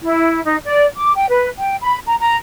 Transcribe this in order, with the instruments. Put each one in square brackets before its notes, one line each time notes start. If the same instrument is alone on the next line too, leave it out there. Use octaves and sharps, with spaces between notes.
[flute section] E4
D#4
D5
D6
G5
B4
G5
B5
A#5
A#5